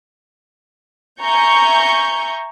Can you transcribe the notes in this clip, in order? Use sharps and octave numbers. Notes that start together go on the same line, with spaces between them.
E5 G#5 A#5 C#6 G6